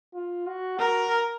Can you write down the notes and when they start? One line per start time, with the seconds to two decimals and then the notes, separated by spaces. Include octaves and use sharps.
0.14 F4
0.47 F#4
0.79 F#4 A#4